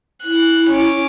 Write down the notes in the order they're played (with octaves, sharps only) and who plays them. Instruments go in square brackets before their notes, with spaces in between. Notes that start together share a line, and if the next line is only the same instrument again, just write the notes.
[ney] E4 [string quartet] F#6
[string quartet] C#4 D6